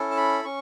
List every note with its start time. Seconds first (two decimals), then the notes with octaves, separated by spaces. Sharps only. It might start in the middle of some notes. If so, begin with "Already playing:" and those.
Already playing: C#4 E4 A4
0.10 A5
0.17 B5
0.44 C#4 C#6